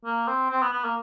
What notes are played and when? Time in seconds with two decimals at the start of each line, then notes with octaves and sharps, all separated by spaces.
0.05 A#3
0.28 C4
0.50 C4
0.62 B3
0.73 B3
0.84 A#3